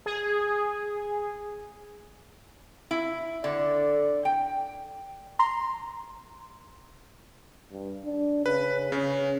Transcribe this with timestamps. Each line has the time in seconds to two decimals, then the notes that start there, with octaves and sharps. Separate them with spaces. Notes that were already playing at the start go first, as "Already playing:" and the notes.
0.06 G#4
2.91 E4
3.44 D3 D5
4.25 G5
5.39 A#5 C6
7.72 G2
8.04 D4
8.46 C#3 B4
8.92 C#3 C#4